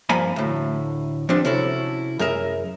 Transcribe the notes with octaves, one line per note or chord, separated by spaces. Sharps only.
G2 F3 A#3 G#5 B5
D2 A2
F3 G3 B3 C4 D4
C3 C#4 E4 F#4 A4
F#2 G#4 A#4 E5